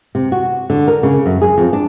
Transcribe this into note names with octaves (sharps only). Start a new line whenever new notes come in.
C3
F#4
D3
A#4
C#3
F#2
G#4
F2
D4